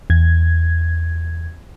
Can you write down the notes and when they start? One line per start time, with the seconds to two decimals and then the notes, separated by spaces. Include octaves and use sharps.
0.10 E2 G#6